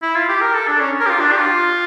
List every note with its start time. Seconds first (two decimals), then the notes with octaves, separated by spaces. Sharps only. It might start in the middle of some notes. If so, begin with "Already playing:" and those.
0.02 E4
0.15 F4
0.29 G4
0.41 A#4
0.54 A4
0.67 D4
0.80 C#4
1.00 A#4
1.06 G4
1.10 F4
1.20 D4
1.32 G4
1.38 F4